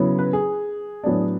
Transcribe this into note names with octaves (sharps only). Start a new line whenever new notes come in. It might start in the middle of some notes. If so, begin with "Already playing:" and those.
Already playing: C#3 F#3 B3 E4
B4
G#4
A2 F#3 B3 D4